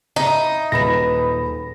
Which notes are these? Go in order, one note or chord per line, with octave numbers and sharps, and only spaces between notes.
D#4 E4 A#5
D#1 F#3 G#4 B4 B5 A#6 E7